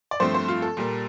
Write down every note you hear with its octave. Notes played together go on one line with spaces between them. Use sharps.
D5
G2 F3 A3 C4 C5
C5
F4
A4
A#2 G3 A#3